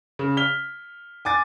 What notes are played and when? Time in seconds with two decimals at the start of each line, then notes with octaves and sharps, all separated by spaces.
0.19 C#3
0.37 F6 B6 F7 G7
1.25 G#5 D6 A6